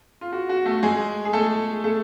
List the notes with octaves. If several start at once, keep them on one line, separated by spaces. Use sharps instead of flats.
F4
F#4
F#4
A3 A4
G#3 G#4
G#4
A3 A4
A3 A4